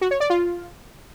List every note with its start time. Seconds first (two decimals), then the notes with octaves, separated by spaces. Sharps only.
0.01 F#4
0.11 C#5
0.20 D5
0.30 F4